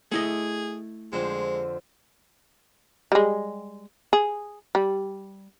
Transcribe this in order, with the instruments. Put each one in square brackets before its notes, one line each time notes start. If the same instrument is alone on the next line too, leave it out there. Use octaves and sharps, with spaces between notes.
[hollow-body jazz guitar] A3 E4 D#5 [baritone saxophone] G#4
[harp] F2 D3 C5 [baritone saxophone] G#3
[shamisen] G3 G#3
G#4
G3